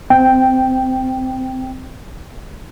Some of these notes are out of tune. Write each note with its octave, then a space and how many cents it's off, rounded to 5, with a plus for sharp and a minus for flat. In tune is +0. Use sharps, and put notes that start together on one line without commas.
C4 -15 G5 +0